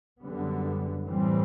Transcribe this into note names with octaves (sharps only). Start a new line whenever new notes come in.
F#2 D3 G3 B3
A2 E3 G3 C4